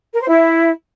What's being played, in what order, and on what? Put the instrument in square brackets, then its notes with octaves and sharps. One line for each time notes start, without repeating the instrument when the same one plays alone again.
[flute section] A#4
C5
E4